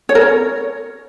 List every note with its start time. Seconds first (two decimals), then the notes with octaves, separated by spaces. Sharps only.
0.09 C#5
0.15 A#4
0.21 C#5